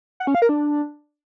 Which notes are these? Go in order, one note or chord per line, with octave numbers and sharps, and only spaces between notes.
F#5
C#4
F5
A#4
D4